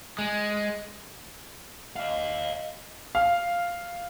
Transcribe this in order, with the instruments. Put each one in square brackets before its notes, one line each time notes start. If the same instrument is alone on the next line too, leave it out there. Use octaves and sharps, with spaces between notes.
[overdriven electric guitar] G#3
[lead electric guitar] D#5 F5
[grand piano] F5